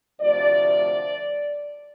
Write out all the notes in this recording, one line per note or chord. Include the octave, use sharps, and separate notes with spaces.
D2 C3 F3 A3 D5